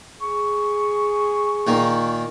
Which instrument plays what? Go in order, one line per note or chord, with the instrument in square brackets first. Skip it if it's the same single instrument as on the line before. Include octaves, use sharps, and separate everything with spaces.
[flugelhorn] G#4 [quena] C#6
[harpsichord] A#2 D#3 A#3